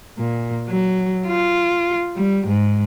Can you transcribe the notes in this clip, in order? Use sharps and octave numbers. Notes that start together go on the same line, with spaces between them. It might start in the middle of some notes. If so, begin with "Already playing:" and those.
A#2
F#3
F4
G3
G#2